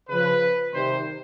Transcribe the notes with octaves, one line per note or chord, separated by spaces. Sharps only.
C#3 F3 B4
C3 D#3 G3 C5